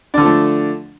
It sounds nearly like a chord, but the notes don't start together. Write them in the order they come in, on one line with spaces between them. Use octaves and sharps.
D4 D3 F3 A3